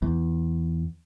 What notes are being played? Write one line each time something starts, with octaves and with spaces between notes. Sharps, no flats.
E2